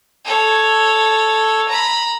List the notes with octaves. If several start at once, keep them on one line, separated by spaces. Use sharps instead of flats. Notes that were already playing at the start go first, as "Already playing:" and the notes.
A4 C#5
A#5 B5